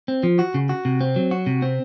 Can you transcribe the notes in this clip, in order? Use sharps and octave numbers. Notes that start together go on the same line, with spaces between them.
C4
F3
F#4
C#3
F#4
C3
C4
F#3
F#4
C3
C4